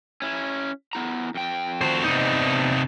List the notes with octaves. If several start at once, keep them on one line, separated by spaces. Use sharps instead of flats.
C#4 E4
B3 E4 A#5
F2 G5
F#4 C5
C3 B3 D#4 D5 D#5